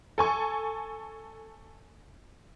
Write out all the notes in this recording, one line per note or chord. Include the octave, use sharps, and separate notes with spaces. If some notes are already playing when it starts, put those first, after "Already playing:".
A4 G#5 C#6